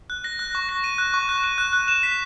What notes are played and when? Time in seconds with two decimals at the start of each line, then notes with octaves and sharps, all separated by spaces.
0.10 F#6
0.24 A#6
0.39 F#6
0.55 C#6
0.69 A#6
0.84 D#7
0.98 F#6
1.14 C#6
1.29 F#6
1.44 D#7
1.58 F#6
1.73 F#6
1.88 E7
2.03 B6